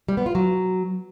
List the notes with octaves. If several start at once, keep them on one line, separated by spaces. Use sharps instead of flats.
G3
B3
F4
F#3